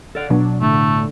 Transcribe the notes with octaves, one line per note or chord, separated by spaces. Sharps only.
A4 D5 F5 F#5
B2 F#3 D4
A2 D3 A3